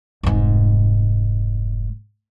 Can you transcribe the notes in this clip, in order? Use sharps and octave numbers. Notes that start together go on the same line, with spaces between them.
F1 G#2